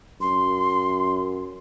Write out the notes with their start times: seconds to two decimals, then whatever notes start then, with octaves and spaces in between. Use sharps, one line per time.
0.21 F#2 C6